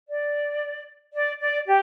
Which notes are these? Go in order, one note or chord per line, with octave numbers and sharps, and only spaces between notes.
D5
D5
D5
G4